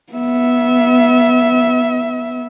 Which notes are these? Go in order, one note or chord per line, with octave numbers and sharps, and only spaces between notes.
B3 E5